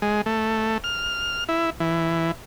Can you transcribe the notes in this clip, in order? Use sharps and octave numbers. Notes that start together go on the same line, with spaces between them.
G#3
A3
F6
E4
E3